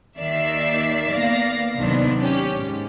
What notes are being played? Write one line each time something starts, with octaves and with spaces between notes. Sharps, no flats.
D#2 D#3 D5 E5 C7
A#3 B3 D5 F5 A#6
D#2 C3 D#3 F#3 B3 D4
C#4 G4
G#2